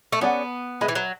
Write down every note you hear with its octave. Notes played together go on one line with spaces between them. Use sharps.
A3
B3 C#4 G#4 D5 F#5
G#3 B4 E5 B5
E3
F#3